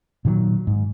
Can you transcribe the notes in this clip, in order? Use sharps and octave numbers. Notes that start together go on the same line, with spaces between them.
A#2 D#3 F3 F#3
G#2